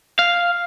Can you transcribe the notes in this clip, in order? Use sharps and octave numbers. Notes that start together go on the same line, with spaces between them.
F5